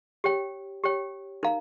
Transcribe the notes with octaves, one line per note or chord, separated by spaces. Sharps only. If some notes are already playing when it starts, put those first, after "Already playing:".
G4 C#5 G5
G4 C#5 G5
D#4 A#4 F5 A#5